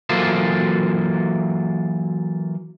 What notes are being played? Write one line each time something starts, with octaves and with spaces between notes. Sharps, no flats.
E3 F#3 A#3 F4 A4 C5